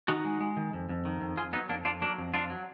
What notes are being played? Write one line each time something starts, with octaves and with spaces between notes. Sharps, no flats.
D#3 D#4 F#4
G#3
G#3
D#3
F2
F2
D#3
F2
F2 F4 G#4
F#3 B3 D#4
F2 A#3 D4
F2 D4 F4
F#3 A#3 D4
F2
F2 D4 F4
F#3